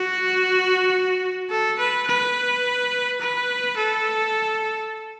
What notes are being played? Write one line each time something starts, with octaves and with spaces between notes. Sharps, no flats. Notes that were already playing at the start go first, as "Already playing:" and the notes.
Already playing: F#4
A4
B4
B4
B4
A4